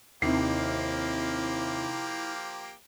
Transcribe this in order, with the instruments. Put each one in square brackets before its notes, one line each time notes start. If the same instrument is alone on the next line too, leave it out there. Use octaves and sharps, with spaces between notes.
[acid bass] D#2 [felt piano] C3 D#3 C7 [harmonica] F3 A#3 G4 [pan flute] E4